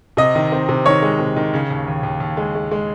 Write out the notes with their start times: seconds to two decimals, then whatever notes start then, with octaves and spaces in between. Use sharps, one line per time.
0.17 C3 D#5
0.35 D#3
0.52 C4
0.68 C3
0.86 D#3 C#5
1.02 G#3
1.19 C3
1.36 D#3
1.53 C#3
1.71 D#2
1.87 D#2
2.03 D#2
2.20 D#2
2.37 G#3
2.55 G#3
2.71 G#3